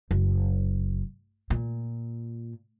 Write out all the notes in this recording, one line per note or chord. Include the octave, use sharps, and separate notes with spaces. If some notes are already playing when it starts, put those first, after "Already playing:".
F#1
A#2